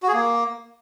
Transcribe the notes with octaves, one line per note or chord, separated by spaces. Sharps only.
F#4
G#4
A#3